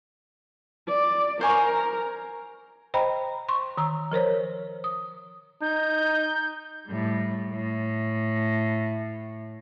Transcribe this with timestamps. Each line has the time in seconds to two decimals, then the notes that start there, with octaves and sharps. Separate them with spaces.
0.88 D5
1.41 A#4 C5 G#5 C#6
2.94 C5 D#5 G5 A#5 B5
3.49 C6 C#6
3.77 D#3 A#5 E6
4.12 F3 A#4 C5 C#5
4.84 D#6
5.62 D#4 G6
6.87 A2 G3
7.51 A2